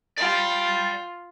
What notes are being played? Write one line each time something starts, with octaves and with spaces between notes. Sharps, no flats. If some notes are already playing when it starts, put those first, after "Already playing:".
F4 D5 G5